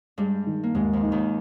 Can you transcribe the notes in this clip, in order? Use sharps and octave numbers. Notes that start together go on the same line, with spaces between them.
G2 G3 G#3
D#3
A#3
D#2 G#2 G#3
F2 F3
D#4
D#2 D#3